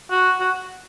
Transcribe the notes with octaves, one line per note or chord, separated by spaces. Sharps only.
F#4
F#4